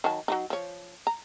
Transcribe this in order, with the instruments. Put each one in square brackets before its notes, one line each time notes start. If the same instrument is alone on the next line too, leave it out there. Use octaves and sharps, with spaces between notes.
[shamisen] D#3 F#3 A5
F#3 A3 D#4
F3 C#5
A#5